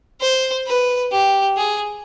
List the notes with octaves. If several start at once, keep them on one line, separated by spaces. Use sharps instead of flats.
C5
B4
G4
G#4